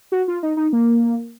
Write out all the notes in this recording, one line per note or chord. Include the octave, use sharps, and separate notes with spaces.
F#4
F4
D#4
D#4
A#3